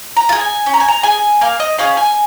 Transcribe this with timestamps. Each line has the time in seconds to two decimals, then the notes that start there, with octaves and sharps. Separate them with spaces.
0.17 A#5
0.29 F4
0.32 G#4
0.41 G#5
0.66 C#4
0.74 A#5
0.80 G#5
0.88 A#5
1.03 G#4 G#5
1.41 A#3 F5
1.60 D#5
1.78 C#4 G#4 F5
1.97 G#5